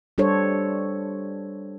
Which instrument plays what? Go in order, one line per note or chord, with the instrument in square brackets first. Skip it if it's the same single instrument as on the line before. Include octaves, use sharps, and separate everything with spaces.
[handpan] G3 D4 G4 A4 C5 C#5